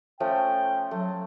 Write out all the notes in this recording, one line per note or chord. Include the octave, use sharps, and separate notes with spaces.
F3 A3 C#4 G5
F#3 A3